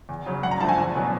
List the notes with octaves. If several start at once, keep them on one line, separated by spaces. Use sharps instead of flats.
E2
C#3 F#3
G2 F#5
A#5
D3 F3 A3 A5
G#5
E2
B2 F#3 B3